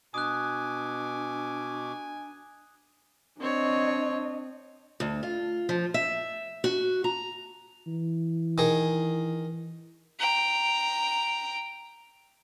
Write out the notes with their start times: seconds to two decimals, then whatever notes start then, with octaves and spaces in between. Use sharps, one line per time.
0.14 B2 D4 G#5 D6 D#6 F#6
3.40 C4 D4 C#5 D#5
5.00 D2
5.23 F4
5.69 F3
5.94 E5
6.64 F#4
7.04 A#5
7.87 E3
8.58 D#3 G#4
10.20 G5 A#5